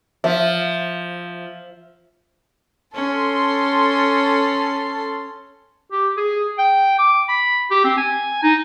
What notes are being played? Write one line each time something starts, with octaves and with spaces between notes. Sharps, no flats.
F3 E5
C#4 A4 C6
G4
G#4
G5
D6
B5
G4
C4
G#5
D#4